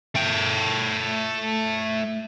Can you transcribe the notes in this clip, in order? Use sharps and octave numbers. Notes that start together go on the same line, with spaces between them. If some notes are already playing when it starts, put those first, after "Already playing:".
A3 G5